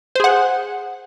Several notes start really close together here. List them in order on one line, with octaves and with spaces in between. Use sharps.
C5 G#4 F#5